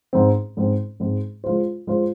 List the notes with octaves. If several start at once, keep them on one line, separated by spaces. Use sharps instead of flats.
G#2 G#3 C4
G#2 G#3 C4
G#2 G#3 C4
G#3 F4 C5
G#3 F4 C5